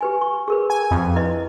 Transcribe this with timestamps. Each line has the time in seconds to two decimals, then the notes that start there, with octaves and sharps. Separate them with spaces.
0.01 G4 B4 G#5
0.21 C#6
0.48 G#4 A#4 B4
0.70 G#5
0.91 F2
1.16 E4 B4 D#5